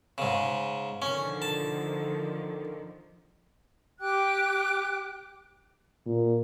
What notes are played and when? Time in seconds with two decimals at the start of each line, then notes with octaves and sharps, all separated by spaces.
0.18 G#2 C#3
1.02 D3 D#3 F3 C#4
1.42 A5
4.00 G4 G5 D6 F#6
6.06 A#2